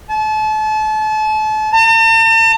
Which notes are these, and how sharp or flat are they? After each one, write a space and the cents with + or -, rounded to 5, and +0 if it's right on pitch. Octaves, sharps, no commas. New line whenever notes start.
A5 -35
A5 +45